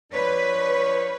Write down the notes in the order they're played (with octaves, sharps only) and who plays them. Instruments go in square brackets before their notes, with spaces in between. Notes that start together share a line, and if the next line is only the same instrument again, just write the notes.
[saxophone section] F3 D4 C#5 [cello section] B4